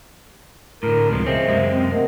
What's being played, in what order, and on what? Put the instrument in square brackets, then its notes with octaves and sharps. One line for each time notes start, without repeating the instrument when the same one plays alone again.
[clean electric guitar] A2 D3 [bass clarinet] A#4
[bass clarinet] C#2 [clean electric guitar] C3 F3 G#3
[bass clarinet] C#3 [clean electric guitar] C4 C#4 [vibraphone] C5 D#5 E5
[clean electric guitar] F#2 G#3 A#3 [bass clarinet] C3
[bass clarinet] C4
[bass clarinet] A3 [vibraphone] A#4 D#5 F#5